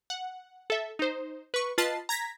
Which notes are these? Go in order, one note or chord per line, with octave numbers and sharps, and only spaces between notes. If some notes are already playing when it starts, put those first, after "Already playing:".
F#5
A4 E5
D#4 C5
B4 C#6
F4 B4 D#5 A5 A6 C7
A#5 G#6 A#6 B6